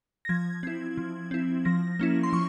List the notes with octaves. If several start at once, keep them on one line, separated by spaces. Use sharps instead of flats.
A#6
F3 G#6
C4 E4
F3
C4 E4
F3 A#6
A#3 C#4 E4
C6
F3 C#6